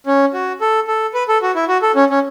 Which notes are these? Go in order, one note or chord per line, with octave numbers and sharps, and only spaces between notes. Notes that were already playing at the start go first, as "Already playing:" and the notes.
C#4
F#4
A4
A4
B4
A4
F#4
E4
F#4
A4
C#4
C#4